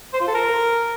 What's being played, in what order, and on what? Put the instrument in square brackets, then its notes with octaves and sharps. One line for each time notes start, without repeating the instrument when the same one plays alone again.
[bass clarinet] C5
F4
A4
A#4